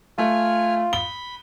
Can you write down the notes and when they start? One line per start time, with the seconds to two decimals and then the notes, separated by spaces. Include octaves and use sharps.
0.18 A3 F4 G#5 F6
0.93 B5 G7